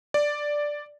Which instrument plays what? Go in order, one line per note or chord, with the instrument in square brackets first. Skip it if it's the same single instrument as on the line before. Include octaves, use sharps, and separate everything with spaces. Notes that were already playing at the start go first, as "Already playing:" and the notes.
[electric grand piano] D5